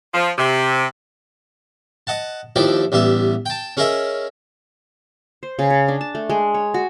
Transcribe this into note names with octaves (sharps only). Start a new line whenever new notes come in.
F3
C3
D#5 F#5 A5
D#2 F3 E4 D5 G5
A1 G3 B3 E5
G5 A5
C#4 G#4 A#4 D#5 E5
C5
C#3
C#5
D4
A5
A3
G#3
C#5
F#4